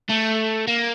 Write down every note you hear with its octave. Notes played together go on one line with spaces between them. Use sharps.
A3
A#3